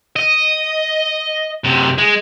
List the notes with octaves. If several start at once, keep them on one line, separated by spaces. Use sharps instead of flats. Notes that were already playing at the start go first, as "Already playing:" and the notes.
D#5
F#2 C3
G#3